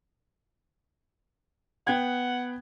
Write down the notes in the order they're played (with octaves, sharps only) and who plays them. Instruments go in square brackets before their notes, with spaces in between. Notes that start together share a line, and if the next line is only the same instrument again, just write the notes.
[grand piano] B3 G5 G#6 [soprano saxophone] F#5